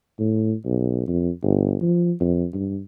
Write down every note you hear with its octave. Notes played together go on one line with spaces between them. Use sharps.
A2
B1
F2
G1
F3
F2
G2